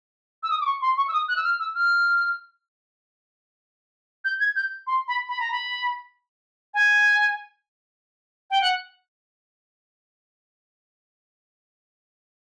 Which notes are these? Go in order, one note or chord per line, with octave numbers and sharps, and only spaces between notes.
E6
D#6
D6
C#6
C6
C#6
E6
D#6
F#6
E6
F6
E6
F6
G6
G#6
G6
C6
B5
B5
A#5
B5
G#5
G5
F#5